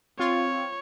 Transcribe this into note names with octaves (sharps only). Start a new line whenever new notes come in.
C4 F4 C#5